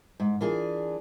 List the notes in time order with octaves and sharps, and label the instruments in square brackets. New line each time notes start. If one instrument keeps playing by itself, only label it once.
[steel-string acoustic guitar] G#2
[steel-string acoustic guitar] E3 D4 G#4 [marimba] F4 A#4